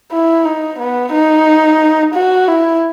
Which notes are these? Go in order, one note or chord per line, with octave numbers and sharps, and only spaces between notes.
E4
D#4
B3
D#4
F#4
E4